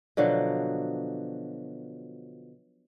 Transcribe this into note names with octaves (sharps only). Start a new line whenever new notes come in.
B2 D3 F3 F#3